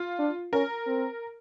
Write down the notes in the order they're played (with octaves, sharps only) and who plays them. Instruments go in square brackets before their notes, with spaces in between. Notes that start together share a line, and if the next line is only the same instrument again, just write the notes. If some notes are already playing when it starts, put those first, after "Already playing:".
Already playing: [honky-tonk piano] F4
[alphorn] D4
[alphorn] C#4 [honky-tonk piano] A#4
[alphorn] C4